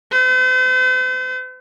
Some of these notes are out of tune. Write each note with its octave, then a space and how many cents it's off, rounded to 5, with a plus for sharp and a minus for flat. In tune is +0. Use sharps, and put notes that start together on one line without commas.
C5 -45